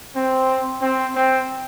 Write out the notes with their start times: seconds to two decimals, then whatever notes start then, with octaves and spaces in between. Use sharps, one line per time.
0.14 C4
0.81 C4
1.15 C4